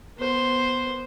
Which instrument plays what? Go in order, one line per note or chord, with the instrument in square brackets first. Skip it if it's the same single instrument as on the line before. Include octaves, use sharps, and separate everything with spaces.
[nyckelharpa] B3 C5